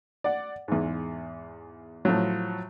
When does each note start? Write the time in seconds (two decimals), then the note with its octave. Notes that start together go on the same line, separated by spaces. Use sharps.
0.24 D5 F#5
0.68 E2 G#2
2.05 A2 F3 F#3